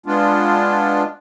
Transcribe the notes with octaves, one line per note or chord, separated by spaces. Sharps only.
G#3 B3 D4 F4